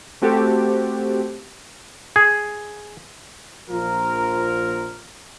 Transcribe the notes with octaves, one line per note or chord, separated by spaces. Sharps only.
A3 C4 F#4 G4 A4
G#4
A#1 F3 F4 A#4